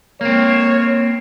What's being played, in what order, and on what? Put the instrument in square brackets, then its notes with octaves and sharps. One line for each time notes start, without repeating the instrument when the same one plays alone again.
[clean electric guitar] A#3 C4 [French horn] C#5